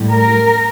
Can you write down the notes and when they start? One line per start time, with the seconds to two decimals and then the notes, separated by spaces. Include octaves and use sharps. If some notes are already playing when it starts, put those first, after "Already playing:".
Already playing: A2 G3
0.10 A#4